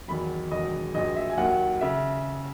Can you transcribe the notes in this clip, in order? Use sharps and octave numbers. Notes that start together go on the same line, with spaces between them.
E2 D#3 F#3 B5
E1 E2 D#3 F#3 D#5
A#1 A#2 F#3 D#5
E5
G#5
D#2 D#3 F#3 F#5
C#3 E5